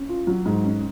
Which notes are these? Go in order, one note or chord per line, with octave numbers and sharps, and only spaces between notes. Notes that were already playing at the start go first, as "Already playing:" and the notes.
Already playing: C#4
F4
F#3
G#2
C#4